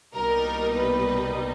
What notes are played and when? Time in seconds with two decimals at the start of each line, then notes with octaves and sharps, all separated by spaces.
0.14 C2 B2 G3 A#3 D#4 A#4
0.75 B4